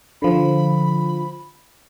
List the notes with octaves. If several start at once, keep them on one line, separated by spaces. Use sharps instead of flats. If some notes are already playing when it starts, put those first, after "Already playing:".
D3 F3 B5